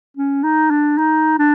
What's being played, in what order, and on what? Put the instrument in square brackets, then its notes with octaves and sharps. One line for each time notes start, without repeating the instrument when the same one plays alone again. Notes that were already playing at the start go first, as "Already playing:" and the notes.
[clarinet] C#4
D#4
D4
D#4
D4